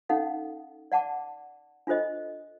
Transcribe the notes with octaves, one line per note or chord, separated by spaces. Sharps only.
C#4 D#4 A4 F5 F#5
D5 F#5 A5 D6
D4 F4 A4 C5 D#5